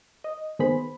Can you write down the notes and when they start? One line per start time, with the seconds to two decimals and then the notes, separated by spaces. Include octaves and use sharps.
0.24 D#5
0.59 D#3 B3 G#4 C5 B5